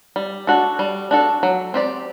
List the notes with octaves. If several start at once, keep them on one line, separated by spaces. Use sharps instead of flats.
G3
D4 F#4 A4
G3
D4 F#4 A4
F#3
C4 G4 D5